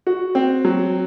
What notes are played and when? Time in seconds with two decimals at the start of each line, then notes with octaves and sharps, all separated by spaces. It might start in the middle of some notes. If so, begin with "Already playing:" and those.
0.07 F#4
0.35 C4
0.65 F#3